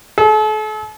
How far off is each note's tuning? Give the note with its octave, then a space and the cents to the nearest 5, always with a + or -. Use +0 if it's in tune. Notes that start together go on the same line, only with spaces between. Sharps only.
A4 -40